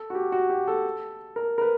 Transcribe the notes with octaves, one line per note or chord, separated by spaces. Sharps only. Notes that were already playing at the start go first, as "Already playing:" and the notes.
Already playing: A4
F#4
G4
F#4
G4
A4
A#4
A#4
B4